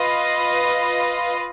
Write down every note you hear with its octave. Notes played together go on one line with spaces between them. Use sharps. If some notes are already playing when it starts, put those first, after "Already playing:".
Already playing: F4 B4 D#5